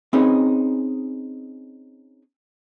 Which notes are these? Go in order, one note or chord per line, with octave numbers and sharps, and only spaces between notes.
C4 C#4 D#4 G#4 B4